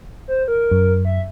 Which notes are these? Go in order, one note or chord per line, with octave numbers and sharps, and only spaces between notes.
C5
A#4
F#2
E5